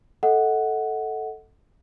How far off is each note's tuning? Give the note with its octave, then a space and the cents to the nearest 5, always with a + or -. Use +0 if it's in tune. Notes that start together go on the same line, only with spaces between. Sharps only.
A4 +0 D#5 +35 F#5 +0